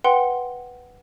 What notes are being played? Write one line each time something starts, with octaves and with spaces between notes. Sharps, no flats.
B4 F#5 G5 C6 G7